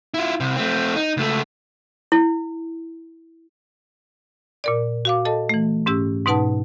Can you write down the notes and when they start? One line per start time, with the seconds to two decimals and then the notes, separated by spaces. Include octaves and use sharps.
0.14 E4 F4
0.40 C2 C3
0.56 A3 C4
0.96 D#4
1.17 C#2 A3
2.12 E4
4.64 A#2 A#4 D5
5.05 F#4 F5 D6
5.25 A4 D#5 A5
5.49 E3 A3
5.86 G#2 C#4 G4 E6
6.26 G#2 B2 D#4 B4 F#5 A5